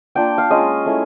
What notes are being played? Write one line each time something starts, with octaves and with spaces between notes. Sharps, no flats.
A#3 D4 F4 G5
F5
G#3 C#4 F4 D#5
A3 C#4 E4